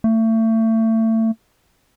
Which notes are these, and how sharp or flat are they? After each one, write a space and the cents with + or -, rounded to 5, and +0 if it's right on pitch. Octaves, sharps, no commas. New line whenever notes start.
A3 +30